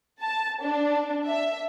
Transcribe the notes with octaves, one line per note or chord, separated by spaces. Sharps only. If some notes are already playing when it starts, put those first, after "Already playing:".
A5
D4
E5